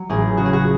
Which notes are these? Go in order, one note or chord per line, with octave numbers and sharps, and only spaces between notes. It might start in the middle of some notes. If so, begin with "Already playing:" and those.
Already playing: F#3
A1 G#4
C#3 F#4
G#4
F#4